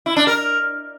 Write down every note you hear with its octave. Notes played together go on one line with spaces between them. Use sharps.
E4
D4
A#4